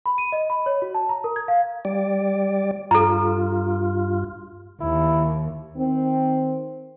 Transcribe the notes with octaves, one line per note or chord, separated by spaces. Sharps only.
B5
D#7
D#5
B5
C#5
F#4
A5
A#5
A#4
G#6
F5
G3 D5
G2 F4 A4 A#5
D#2 E4
D#3 C4